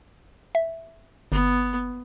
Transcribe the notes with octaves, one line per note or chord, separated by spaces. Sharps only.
E5
G1 B3